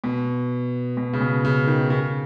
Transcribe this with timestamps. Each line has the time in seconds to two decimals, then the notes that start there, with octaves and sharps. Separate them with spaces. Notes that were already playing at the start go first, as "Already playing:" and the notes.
0.04 B2
0.97 B2
1.13 C#3
1.21 B2
1.45 C#3
1.67 D#3
1.90 C#3